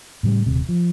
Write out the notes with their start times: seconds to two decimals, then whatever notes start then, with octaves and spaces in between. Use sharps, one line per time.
0.23 A2 C#3 F3 G3
0.46 D#1 C3
0.69 F3